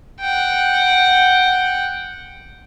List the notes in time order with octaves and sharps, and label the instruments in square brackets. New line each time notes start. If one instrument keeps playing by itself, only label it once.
[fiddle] F#5 G5